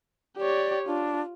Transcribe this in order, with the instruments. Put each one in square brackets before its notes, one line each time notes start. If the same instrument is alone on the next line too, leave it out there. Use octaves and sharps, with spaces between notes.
[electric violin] G4 C#5 [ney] D5
[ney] D4 [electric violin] F4